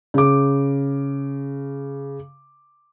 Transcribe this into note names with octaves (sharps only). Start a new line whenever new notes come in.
C#3 D6